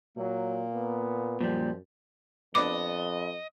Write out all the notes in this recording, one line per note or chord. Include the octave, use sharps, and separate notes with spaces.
A#2 F#3 A#3
B3
F#2 A#2 F3 G3
F2 B3 D4 D#5 D6